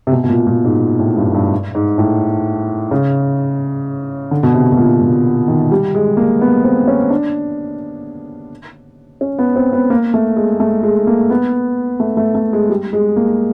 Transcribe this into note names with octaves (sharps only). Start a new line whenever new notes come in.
C3
B2
B2
A#2
A#2
G#2
A2
G2
G2
G#2
A2
C#3
D3
B2
C3
B2
A#2
A#2
D#3
G3
G#3
A#3
B3
C4
C#4
D4
C#4
B3
C4
B3
A#3
A3
G#3
A3
G#3
A#3
B3
A3
A3
A3
G#3
G3
G#3
A#3